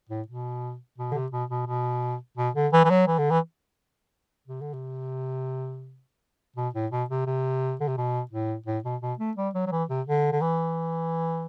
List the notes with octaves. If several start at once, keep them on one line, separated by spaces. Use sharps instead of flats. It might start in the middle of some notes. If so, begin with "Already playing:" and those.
A2
B2
B2
D3
C3
B2
B2
B2
B2
D3
E3
E3
F#3
E3
D3
E3
C3
D3
C3
B2
A2
B2
C3
C3
D3
C3
B2
A2
A2
B2
B2
A3
G3
F#3
F#3
E3
C3
D3
D3
E3